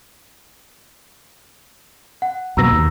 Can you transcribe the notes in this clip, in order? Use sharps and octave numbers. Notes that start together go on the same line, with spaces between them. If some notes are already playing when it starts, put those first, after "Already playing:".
F#5
F#2 B2 A#3 A#5 E6 A#6
D#2